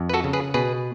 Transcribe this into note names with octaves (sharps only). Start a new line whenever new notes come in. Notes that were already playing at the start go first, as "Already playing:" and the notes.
Already playing: F2
B4
F#4 A4
C#3
G#4 B4
B2 G#4 B4